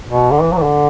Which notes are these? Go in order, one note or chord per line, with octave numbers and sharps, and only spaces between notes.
B2
D3
E3
F#3
E3
D3